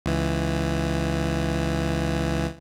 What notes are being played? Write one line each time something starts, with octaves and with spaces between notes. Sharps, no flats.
C#2 E3